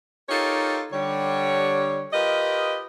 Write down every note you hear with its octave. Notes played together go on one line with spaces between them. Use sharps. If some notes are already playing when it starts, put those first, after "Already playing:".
D#4 F4 G4 A4 A#4 C#5
D3 G3 C#5
F4 G4 A#4 B4 D#5